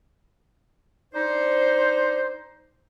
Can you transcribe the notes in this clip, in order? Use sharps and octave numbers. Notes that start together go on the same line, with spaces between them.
D4 D#4 C5